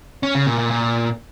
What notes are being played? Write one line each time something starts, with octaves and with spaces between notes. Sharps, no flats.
C#4
C#3
A#2
A#2
A#2